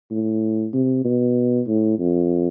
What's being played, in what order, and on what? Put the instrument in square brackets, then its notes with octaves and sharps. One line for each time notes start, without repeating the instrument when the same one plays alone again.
[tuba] A2
C3
B2
A2
F2